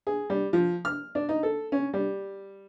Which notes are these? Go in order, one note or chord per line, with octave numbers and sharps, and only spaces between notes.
G#4
G3
F3
F6
D4
D#4
A4
C#4
G3